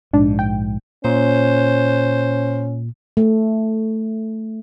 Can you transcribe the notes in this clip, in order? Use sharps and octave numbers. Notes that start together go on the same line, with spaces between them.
A#1 G#2 D4
G5
A#2 C#4 C5
A3